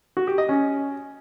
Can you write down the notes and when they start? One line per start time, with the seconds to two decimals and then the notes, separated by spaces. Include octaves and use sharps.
0.17 F#4
0.27 G4
0.38 D#5
0.49 C#4